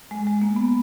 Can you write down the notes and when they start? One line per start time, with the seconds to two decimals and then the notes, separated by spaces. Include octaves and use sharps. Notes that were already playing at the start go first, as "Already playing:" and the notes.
0.11 G#3
0.27 G#3
0.41 A#3
0.56 B3